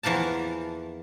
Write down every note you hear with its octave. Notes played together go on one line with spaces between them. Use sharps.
E2 E3 F3 A#3 A5